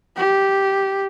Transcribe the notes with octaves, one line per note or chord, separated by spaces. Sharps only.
G4